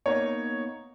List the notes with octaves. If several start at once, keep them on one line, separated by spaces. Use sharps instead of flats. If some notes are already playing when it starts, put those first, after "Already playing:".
A#3 B3 D#4 C#5